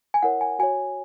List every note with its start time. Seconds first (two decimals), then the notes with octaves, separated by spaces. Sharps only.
0.14 G#5
0.23 E4 A#4 C#5 F#5
0.41 G#5
0.59 F#4 C#5 G#5